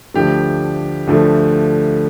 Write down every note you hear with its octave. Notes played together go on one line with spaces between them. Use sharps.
D2 D3 F3 A3 G4
D2 D3 F3 A3